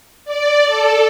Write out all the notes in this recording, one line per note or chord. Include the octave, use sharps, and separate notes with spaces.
D5
A4